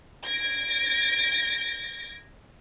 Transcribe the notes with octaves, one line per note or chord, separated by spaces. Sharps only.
G#6 A#6 D7